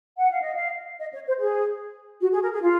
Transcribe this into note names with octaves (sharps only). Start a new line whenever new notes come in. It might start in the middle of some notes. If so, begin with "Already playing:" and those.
F#5
F5
D#5
F5
D#5
C#5
C5
G#4
F#4
G#4
A#4
G#4
F4